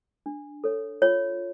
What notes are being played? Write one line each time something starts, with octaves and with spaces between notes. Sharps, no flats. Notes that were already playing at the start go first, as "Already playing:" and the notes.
D4
A4 C#5
F4 C#5